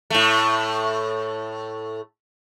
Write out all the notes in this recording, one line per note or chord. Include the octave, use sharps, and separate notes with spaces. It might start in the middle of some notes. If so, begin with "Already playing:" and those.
A2 A3